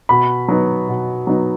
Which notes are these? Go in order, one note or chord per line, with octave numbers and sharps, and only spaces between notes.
B2 B5
F#3 B3 D#4
B2
F#3 B3 D#4